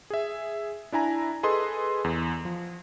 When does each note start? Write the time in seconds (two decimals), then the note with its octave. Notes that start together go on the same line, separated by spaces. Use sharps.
0.10 G#4 E5
0.92 D4 E4 G#5 A#5
1.43 G#4 A4 B4 D#5 C6
2.04 E2
2.45 F3